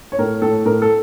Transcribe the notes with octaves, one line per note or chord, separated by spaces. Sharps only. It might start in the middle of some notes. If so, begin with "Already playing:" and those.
C#5
A2 A#4
A2 A4
A2 A#4
A4